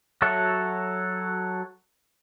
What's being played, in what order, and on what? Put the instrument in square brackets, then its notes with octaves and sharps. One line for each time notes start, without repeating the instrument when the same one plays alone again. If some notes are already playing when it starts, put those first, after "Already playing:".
[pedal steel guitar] F#3 F#4 A4 C#5 E5